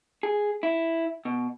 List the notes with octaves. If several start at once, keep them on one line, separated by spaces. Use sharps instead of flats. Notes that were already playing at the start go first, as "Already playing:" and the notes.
G#4
E4
B2